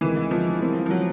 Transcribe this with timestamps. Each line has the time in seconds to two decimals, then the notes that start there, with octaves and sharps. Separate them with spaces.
0.01 D2 C3 D#3 E3 G#3
0.31 F3
0.61 E3 G3 C4 F4 A#4
0.86 F3
0.90 F#3